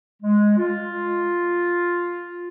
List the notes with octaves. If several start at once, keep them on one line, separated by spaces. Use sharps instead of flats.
G#3
F4